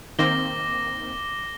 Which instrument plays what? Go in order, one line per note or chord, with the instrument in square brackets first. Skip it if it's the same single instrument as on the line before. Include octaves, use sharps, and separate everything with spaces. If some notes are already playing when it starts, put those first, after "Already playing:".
[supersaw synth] D#3 A#3 C4 [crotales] D6 A#6 G7